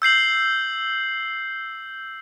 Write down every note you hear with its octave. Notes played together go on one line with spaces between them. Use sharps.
E6 G6 C7 F#7